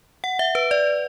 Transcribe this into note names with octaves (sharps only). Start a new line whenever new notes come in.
F#5
E5
B4
D5